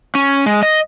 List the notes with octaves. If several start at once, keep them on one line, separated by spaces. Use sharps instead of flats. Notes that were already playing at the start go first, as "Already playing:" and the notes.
C#4
G#3
D#5